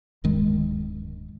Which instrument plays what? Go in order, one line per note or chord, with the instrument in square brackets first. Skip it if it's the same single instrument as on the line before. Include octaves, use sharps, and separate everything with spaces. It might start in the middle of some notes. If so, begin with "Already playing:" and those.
[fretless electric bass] D1 G2 D#3 G#3